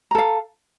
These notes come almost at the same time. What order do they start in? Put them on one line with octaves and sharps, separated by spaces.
A#5 A4 F5